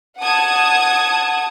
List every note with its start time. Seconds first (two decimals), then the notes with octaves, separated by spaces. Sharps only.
0.19 F#5 A5 D#6 G#6